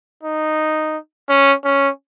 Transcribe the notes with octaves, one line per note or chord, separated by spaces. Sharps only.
D#4
C#4
C#4